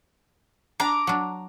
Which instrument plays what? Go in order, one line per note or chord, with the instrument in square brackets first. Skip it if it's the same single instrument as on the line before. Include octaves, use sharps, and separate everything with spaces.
[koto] D4 [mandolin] A#5 D6
[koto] F#3 D4